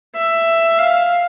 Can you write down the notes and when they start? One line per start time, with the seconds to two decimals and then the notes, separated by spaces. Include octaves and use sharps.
0.15 E5
0.78 F5